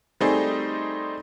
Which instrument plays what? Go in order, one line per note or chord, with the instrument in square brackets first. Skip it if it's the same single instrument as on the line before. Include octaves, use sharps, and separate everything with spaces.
[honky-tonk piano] G3 A3 C4 D#4 G#4 C5